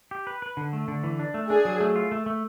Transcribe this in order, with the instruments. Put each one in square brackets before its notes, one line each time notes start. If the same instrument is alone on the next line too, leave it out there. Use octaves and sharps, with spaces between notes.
[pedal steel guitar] G4
B4
B4
D3
A3
D3
E3
D4
A3
[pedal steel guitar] D4 [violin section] G#4
[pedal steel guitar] F#3
A3
F4
A3
A3